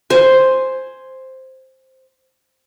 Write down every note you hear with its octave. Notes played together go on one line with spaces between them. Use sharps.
C5 G#5